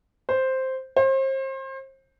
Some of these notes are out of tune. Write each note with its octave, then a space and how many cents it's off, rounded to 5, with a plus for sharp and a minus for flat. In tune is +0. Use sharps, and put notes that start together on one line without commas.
C5 +0
C5 +35